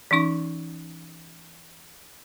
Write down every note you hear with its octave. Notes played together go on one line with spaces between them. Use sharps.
E3 C#4 D#4 C#6